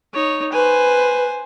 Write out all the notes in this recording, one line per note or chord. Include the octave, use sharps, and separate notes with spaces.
D#4 C#5
B4 C5 G#5